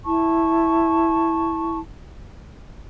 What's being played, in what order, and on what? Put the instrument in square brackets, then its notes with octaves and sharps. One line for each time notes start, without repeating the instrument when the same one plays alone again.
[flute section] E4 A5 C#6